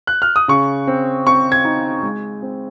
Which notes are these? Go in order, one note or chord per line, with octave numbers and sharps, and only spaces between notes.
F#6
F6
D#6
C#3 C#6
C4
C4 C#6
G#6
D#4
G#3
C4